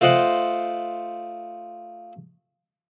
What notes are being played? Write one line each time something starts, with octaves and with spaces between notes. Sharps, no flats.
A3 F4 C5 D#5 F#5 G5